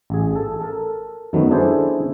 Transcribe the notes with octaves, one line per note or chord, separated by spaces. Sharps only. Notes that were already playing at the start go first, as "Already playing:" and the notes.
A1 G#4
A4
A4 A#4
F#2 D#3 F#3 A3 B3
C#4 D4 E4 G#4 A4 C5